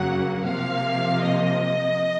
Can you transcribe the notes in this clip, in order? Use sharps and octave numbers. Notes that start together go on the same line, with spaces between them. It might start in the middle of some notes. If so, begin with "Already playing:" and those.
Already playing: F#2 C#3 F#3 A#3 F#5
C3 F3 A#3 F5
D#5